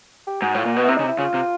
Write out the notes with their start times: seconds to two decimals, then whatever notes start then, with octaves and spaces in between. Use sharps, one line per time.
0.27 G4
0.42 G#2 F#4
0.54 A2 F4
0.65 A#2
0.73 B2 F#4
0.85 C3 E4
0.97 C#3 D#4
1.03 C3
1.08 E4
1.19 C#3 F4
1.34 C3